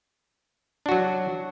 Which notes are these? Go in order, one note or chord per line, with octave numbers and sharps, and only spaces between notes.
F#3 D4 F#4